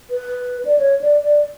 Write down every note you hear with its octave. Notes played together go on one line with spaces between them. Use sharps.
B4
D5
C#5
D5
D5